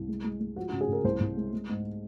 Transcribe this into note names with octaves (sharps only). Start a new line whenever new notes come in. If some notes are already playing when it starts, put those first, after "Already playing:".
Already playing: C2
G#3
G#3
G#3
F3 F#4
F#4
C#3
G#4
C#3 A#4
C2 C5
C2
G#3
G#3
G#2